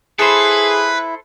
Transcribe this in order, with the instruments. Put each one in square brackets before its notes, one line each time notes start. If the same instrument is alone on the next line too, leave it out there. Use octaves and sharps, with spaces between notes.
[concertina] E4 [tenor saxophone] G#4 [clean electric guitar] A4 C5 [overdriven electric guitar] B4